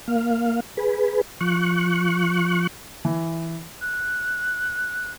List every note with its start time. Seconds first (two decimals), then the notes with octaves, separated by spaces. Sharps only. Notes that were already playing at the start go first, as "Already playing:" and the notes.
0.08 A#3 F5
0.77 G#4 B4
1.41 F3 C#6 F#6
3.05 E3
3.82 F#6